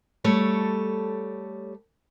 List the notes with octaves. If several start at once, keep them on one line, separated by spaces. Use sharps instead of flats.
G3 A3 A4 C#5